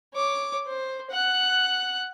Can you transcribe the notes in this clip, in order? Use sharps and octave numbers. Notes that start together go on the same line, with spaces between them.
C#5 D6
C5
F#5 F#6